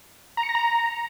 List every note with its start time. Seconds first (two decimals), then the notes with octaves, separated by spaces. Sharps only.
0.37 A#5
0.43 C#7
0.49 A#6
0.55 A#5